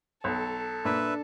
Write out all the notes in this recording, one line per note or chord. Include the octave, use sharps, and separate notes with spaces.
B1 A4
A#2 D4 B4 E5